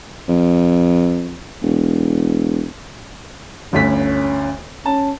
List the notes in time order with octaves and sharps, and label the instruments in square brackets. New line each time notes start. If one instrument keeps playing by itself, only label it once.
[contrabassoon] F2
E1
[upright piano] G1 D2 B6 [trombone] C#4
[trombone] C#4 [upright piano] A5